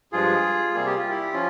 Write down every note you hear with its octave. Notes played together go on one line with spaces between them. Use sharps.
G2 F3 G#3 F4 G#4
C3 G3 A#3 G#4
G4
F4
E4 G4
F3 C#4 F4